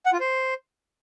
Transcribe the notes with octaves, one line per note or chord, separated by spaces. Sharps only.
F#5
F4
C5